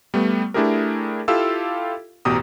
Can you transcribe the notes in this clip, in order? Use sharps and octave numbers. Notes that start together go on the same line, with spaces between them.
G3 A3 B3
A3 D4 E4 G4 G#4 A#4
E4 F4 G4 A4 F5 E6
A1 E2 B2 G4 A#5 D#6